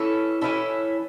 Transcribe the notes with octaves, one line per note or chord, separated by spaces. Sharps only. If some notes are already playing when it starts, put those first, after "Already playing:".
Already playing: E3 C#4 E4 A4
E3 C#4 E4 A4